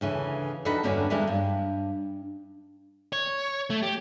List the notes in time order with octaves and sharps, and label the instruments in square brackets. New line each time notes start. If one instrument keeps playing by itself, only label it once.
[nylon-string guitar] D2 C#3 E3
F2 D4 D#4 F#4 A4 B4
E2 G2 D3 C#4 D4 F#4
D3 E3 G3 G#3 A#3 D4
G2
[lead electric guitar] C#5
A3
G4